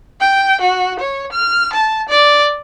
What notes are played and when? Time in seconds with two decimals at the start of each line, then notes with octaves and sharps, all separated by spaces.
0.21 G5
0.61 F#4
1.00 C#5
1.32 F6
1.73 A5
2.09 D5